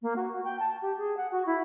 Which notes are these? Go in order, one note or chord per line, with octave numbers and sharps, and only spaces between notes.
A#3
F#4
F#4
G5
A5
G4
G#4
F#5
F#4
E4